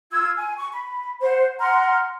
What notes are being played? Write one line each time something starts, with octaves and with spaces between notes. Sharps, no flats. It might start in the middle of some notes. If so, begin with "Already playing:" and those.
F4 E6 G#6
G#5
C#6
B5
C5 F#5
F#5 A#5 C6 F6